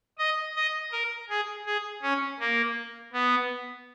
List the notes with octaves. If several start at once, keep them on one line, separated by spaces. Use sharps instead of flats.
D#5
D#5
A#4
G#4
G#4
C#4
A#3
B3